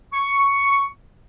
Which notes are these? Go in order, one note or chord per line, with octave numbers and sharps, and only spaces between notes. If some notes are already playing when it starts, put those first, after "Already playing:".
C#6